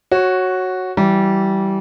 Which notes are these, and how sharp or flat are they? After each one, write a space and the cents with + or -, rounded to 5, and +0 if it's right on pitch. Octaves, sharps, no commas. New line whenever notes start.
F#4 +0 C#5 -15
E3 +0 G3 -20